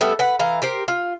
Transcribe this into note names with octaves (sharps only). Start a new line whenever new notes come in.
G3 A3 B3 A4
B4 F#5
E3 F5 A#5
G4 A#4 C5
F4